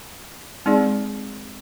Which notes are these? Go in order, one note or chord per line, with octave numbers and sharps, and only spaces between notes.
G#3 C4 D#4 G#4 D5